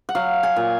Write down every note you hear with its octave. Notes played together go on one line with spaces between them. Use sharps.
F#5
F#3 F5
G#5
A#2